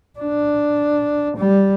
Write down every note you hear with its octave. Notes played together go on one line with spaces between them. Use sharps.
D4
G3